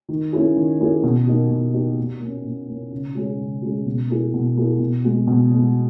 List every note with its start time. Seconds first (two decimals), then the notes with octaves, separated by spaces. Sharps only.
0.09 D#3
0.33 A#3 C#4 E4 G#4
0.56 D#3
0.80 A#3 C#4 E4 G#4
1.03 B2
1.27 A#3 D#4 G4
1.51 B2
1.74 A#3 D#4 G4
1.98 A#2
2.21 A#3 C#4
2.44 A#2
2.69 A#3 C#4
2.91 C#3
3.15 G#3 C#4 G#4
3.39 C#3
3.62 G#3 C#4 G#4
3.86 B2
4.09 A#3 E4 G#4
4.34 B2
4.56 A#3 E4 G#4
4.80 B2
5.04 G#3 B3
5.27 B2
5.51 G#3 B3